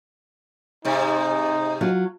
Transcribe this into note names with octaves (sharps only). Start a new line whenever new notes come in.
G#2 C3 D#4
F#3 F4